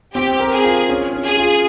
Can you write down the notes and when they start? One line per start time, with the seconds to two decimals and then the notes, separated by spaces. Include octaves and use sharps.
0.15 C4 G4
0.40 A#4
0.52 G#4
0.64 F4
0.89 C#4
1.13 C#4
1.25 G#4
1.38 F4